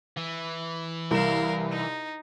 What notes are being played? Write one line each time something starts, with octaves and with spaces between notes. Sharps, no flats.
E3
C2 A#4 F5 E7
D#4